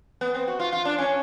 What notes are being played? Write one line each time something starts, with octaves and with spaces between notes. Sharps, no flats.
B3
C4
F#4
F4
F4
D4
C#4